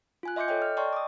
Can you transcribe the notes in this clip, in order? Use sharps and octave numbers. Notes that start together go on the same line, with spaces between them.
F4 G#5 F#6
D#5 E5 C6 D6 G6 C#7
A4 C#5 D#5 G5
F6
D5 D#5 G5 A5 C6 C#6
D6 D#6